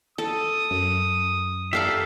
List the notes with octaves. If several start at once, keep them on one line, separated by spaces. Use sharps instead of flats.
A4 D#6
F#2
G4 A4 D5 E5 F5 A#5